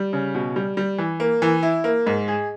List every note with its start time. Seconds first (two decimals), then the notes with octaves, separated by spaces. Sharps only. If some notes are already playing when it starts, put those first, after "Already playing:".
Already playing: G3
0.13 C#3
0.35 B2
0.56 G3
0.77 G3
0.98 E3
1.20 A#3
1.42 E3
1.63 E4
1.84 A#3
2.07 G#2
2.28 G#4